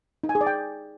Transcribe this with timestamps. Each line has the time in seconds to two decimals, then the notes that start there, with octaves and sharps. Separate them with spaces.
0.23 D#4
0.29 G#5
0.35 G#4
0.41 D5
0.47 G5